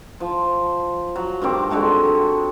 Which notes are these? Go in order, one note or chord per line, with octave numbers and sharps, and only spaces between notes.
F3
F#3
G2 D#3 C4 D6
D3 G#3 F#4 A4